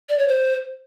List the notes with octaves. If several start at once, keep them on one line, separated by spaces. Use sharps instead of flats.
D5
C#5
C5